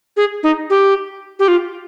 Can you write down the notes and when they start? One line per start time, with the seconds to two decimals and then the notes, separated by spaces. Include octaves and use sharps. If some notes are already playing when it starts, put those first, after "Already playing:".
0.17 G#4
0.43 D#4
0.70 G4
1.39 G4
1.48 F4